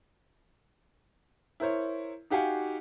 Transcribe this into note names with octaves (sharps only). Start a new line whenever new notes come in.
E4 A#4 C5 C#5
D#4 F#4 G4 F5 F#5 G#5